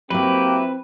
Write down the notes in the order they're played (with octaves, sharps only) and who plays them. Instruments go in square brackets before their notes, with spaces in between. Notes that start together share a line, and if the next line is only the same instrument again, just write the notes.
[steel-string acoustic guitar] F#3 E4 [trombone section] A#3 G4 [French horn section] C4 [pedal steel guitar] B4